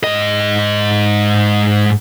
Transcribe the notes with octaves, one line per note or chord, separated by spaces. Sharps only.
G#2 D#5